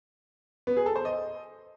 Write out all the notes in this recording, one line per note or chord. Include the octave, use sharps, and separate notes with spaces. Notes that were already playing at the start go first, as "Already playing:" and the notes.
B3
G#4
A4
C5
D#5